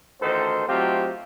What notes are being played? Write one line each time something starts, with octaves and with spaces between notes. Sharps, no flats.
A1 D2 D#3 A4 C5
F#3 A3 C4 D#4 F4 G4